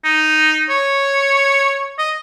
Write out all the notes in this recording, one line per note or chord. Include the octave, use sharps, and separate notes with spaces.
D#4
C#5
D#5